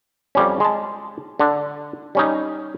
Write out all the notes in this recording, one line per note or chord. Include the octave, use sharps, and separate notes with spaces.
F2 G3 C#4
G#3 A5
D3 D4
G3 C#4 D#4